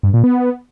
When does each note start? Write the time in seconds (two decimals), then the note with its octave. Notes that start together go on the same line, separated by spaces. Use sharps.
0.03 G2
0.13 A#2
0.24 B3